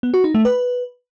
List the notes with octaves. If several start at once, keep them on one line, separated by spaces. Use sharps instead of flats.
B3
F#4
D#4
A3
B4